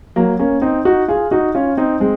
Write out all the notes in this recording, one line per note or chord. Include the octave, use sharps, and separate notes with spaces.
F#3 A#3
A#3 C#4
C4 D#4
D#4 F#4
F4 G#4
D#4 F#4
C#4 F4
C4 D#4
G#3 C4